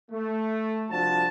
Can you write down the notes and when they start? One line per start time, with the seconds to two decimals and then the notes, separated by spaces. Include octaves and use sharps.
0.11 A3
0.90 C2 F3 D4 F#4 A5